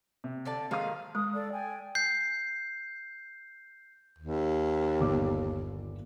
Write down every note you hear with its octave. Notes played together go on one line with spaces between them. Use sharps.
C3
D3 D5 A5
D#3 F3 G#3 F5 D#6
G#3 D#6
A4 D5
G5 G#5
G6 C7
D#2
G1 A#2 D6